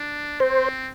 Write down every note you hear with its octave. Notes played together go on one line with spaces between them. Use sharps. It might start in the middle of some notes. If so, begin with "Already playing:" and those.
Already playing: D4
C4 C5